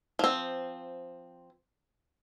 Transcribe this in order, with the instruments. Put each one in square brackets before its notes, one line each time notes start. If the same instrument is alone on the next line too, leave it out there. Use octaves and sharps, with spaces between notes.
[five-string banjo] F3 C4